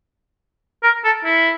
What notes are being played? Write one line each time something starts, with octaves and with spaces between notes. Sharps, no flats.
A#4
A4
E4